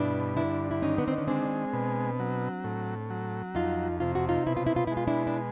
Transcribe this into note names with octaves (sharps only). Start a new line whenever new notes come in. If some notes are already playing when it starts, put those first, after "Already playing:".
Already playing: G2 B2 D4 E4
D3 D4 E4
E4
D#3 C#4 D#4
B3
C4
C#4
G#3 C4 D4
B2
F#3
A2
F#3
F2 D#4 F4
C3 F4
F#4
D#4 F4
B2 E4
F4
E4
F4
G#3 E4
F4
D4 E4
D4